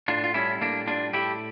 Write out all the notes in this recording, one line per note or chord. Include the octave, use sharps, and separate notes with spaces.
A2 D4 F4
F4
G3 C#4 E4
A2 A#3 D4
G3 D4 F4
A2 E4 G4